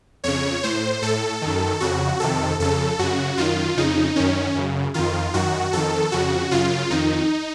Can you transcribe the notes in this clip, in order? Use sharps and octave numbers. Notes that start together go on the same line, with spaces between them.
F2 C#3 C#5
A2 C5
A2 A4
F#2 D#3
F2 C#3 F#4
F2 C3 D#3 A4
F2 C#3 A4
F#2 C#3 F#4
F#2 D#3 F4
F2 C#3 D#4
F#2 D#3 C#4
F#2 C#3
F2 D#3 F4
F#2 D#3 F#4
F2 D#3 A4
F2 C#3 F#4
F#2 C#3 F4
F2 D#3 D#4